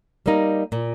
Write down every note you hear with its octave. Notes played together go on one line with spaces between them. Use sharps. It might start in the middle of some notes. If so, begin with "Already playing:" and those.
G3 A#3 D#4
A#2